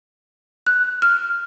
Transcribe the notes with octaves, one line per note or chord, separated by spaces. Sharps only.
F#6
F6